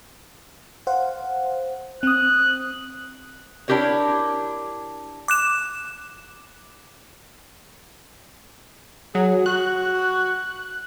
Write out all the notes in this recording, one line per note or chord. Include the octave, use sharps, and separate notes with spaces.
C5 F5 F#5
C4 D#6 F#6
D4 E4 G4 A#4 C#5
D6 F#6 E7
F#3 G#4
F#4 F#6